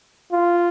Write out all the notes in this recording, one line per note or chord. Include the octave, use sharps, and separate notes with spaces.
F4